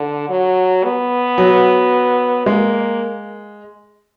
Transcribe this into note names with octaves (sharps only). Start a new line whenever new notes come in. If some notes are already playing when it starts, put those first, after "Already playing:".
Already playing: D3
F#3
B3
F#3
G#3 A#3